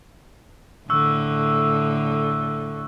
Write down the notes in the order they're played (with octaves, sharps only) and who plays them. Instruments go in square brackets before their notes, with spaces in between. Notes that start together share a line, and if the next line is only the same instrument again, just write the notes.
[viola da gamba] A2 D3 [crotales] C#6 E6 F#6